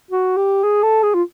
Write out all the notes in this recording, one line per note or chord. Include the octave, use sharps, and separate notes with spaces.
F#4
G4
G#4
A4
G#4
F4